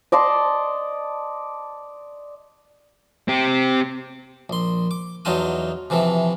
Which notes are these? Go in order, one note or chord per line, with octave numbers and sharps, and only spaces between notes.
D5 D#5 A5 C6
C4 G4
A#1 C6
D6
E2 F#3 D#4 F4 A5 D#6
C3 E3 F3 A4